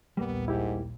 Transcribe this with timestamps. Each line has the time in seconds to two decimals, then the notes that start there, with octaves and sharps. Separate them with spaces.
0.17 A#1 D#2 G3 A#3 B3
0.48 G#2 E4 G4